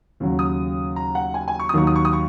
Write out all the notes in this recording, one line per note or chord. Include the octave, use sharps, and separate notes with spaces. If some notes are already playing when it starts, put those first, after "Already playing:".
D#2 C#3 F#3
D#6
A#5
F#5
G#5
G#5
C#6
D#6
D#2 D#3 F#3 C#6
D#6
C#6
D#6
C#6